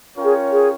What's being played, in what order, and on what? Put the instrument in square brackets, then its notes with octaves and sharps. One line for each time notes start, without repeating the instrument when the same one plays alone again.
[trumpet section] C#4 F4 A#4 C#5 G5
[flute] G#4
G#4